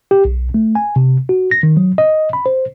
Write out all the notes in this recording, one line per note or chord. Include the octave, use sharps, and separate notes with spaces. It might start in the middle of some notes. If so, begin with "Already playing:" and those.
G4
B1
A3
G#5
C3
F#4
A#6
D#3
F#3
D#5
B5
C5